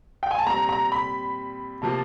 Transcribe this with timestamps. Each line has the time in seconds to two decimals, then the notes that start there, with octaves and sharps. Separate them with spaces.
0.23 G5
0.31 G#5
0.39 A5
0.46 A#2 G3 C4 A#5
0.69 A#5
0.92 B5
1.82 C3 F3 A#3 A5